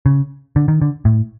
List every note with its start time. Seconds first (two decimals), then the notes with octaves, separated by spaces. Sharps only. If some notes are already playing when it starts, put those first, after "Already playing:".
0.06 C#3
0.56 D3
0.68 D#3
0.82 D3
1.05 A2